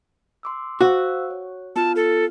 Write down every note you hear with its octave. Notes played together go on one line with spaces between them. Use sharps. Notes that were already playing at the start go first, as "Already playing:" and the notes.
C6 D6 E6
F#4 C5 F5 E6
C#5
B3 F4 A5 F6
A4